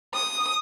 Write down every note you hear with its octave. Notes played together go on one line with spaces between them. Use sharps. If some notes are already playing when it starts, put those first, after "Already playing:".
D#6